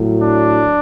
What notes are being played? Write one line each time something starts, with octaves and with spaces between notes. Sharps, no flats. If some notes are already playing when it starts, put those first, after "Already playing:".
Already playing: A2 F#3
D4